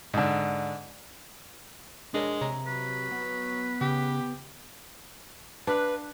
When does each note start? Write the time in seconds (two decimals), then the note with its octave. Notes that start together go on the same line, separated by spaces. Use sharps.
0.14 G#2 D3
2.14 G#3 D4 A#4 C#5
2.41 C3 C#5 A#5
2.66 F#3 B4
3.12 B3
3.81 C#3 G4
5.67 D4 B4 F5